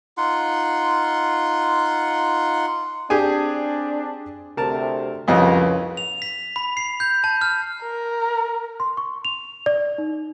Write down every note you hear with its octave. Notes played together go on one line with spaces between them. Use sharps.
D#4 F4 F#5 C6
C4 D4 G4 G#4 G#5
D2 C3 A#4 A5
C2 F2 C#3 F#3 B4 D#5
F7
B6
B5
C7
G6
A5
F6
A#4
C6
C#6
F7
D5
D#4